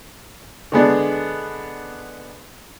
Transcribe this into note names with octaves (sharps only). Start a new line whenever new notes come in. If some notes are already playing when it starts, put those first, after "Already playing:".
D3 G#3 B3 D4